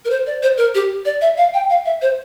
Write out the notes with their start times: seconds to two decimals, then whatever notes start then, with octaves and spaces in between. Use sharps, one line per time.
0.05 A#4
0.10 C5
0.27 D5
0.43 C5
0.57 A#4
0.74 G4
1.05 D5
1.21 E5
1.37 F5
1.54 G5
1.70 F5
1.85 E5
2.02 C5